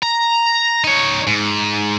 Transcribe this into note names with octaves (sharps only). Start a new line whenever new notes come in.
A#5
D#4 C#5
G#2